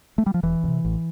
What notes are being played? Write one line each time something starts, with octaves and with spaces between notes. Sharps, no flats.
A3
G3
F3
E1 E3
D2
C3
A1